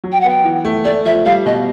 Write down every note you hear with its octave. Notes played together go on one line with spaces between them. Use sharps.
F#3
G5
F#5
B3 G5
E3
A3
A3 D5
F3 E5
G3 F5
B2 D#5